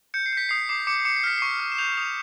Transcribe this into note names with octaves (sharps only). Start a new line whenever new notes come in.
G6 C#7
C7
G6 B6
D#6 C7
D6 C7
D6 C#7
D6 C#7
C7
F6 B6
C#6 C7
F6
E7
G6 F7
D#6 F7